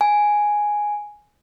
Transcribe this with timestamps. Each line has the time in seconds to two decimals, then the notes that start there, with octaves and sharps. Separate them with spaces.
0.01 G#5